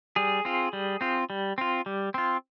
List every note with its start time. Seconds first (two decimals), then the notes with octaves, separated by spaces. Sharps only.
0.16 G3 G#4
0.45 C4 F4
0.73 G3
1.01 C4 F4
1.30 G3
1.58 C4 F4
1.86 G3
2.14 C4 F4